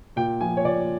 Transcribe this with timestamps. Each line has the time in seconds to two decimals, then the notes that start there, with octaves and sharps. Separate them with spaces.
0.16 A#2 G5
0.41 F3 G#5
0.57 C#5
0.64 A#2 D5